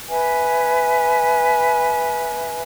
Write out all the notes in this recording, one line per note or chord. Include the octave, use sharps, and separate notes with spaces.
B4 E5 G#5